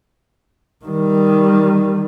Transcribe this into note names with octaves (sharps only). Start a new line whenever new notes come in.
D#3 G3